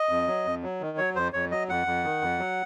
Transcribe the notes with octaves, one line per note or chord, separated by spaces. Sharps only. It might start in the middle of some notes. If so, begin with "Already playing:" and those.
Already playing: D#5
F2
F#3
F2
F#3
D#3
F#3 C#5
F2 C5
F2 C#5
F#3 D#5
F2 F#5
F2
D#3
F2
F#3